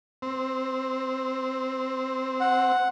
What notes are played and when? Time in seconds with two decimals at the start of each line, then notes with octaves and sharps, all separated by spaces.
0.22 C4
2.40 F#5